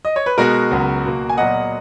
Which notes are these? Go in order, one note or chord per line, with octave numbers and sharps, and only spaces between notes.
D#5
C#5
B4
B2 G#3 B3 F#4 A#4
C#2 C#3 F#3 B3
B2 A#3
G#5
A#2 F#3 B3 D#5 F#5